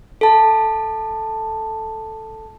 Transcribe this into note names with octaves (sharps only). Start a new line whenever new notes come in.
A4 A5